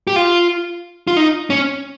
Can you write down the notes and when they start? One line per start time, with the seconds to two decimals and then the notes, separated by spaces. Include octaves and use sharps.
0.07 G4
0.16 F4
1.07 F4
1.17 D#4
1.50 C#4